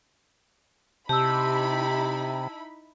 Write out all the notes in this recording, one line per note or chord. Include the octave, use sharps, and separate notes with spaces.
C3 D#4 E4 G4 A5 B5 E6